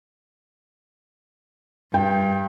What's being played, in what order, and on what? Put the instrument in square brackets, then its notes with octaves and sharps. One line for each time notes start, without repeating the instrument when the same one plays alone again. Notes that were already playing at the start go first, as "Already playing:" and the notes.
[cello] G2 [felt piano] G5